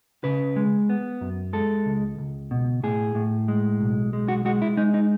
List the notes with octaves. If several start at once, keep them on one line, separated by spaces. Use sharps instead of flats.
C#3 B4
G#3
B3
F#2
G#3 A4
C#2
C#2
B2
A2 G#4
A2
G#3
B1
G#3
F#4
G#3 F#4
E4
G#3 D#4
D#4